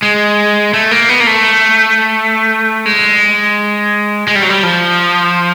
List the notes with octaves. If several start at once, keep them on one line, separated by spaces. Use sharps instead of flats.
G#3
A3
A#3
B3
A#3
A3
G#3
G#3
G3
F#3
G3
F3